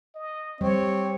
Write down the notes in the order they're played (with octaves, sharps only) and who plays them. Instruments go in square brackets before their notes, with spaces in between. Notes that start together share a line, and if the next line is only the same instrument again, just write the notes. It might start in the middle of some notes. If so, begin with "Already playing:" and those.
[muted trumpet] D#5
[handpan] G3 [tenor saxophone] C4 [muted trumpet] C#5